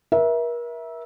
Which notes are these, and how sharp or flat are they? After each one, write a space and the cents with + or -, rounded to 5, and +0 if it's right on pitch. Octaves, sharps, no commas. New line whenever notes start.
A#4 +40 E5 -10